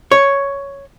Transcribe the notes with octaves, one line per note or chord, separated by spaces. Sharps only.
C#5